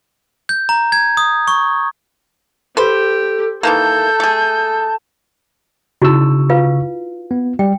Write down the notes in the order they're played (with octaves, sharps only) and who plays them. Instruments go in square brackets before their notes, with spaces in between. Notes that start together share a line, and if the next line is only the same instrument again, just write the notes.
[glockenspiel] G6
A#5
G#6
D#6
C#6
[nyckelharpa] G4 [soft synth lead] A4 [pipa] B4 C5
[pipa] D#3 E3 A#3 [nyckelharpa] A4 [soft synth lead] A5 [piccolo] G6
[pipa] A3 G#4
[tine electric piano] C#3 C#6 E6 [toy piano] D#4 E4 F#4
[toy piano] F4 B4 F5
[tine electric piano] B3
[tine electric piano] G3 [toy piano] G5